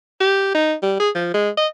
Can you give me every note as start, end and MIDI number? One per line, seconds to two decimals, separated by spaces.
0.20 0.50 67
0.54 0.74 63
0.82 0.95 55
1.00 1.10 68
1.15 1.32 53
1.34 1.50 56
1.57 1.67 75